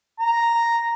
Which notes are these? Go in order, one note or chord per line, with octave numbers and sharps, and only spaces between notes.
A#5